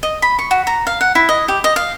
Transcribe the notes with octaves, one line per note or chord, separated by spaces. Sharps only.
D#5
B5
C#6
F#4
A#5
F5
F#5
E4
D#5
G4
D#5
F5